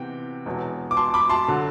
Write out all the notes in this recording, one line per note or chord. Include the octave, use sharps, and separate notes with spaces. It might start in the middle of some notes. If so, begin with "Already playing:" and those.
Already playing: C3 E3 B3 G5
E1 E2 B2 F#3
D6
A5 C6
B5 D6
A5 C6
D3 F#3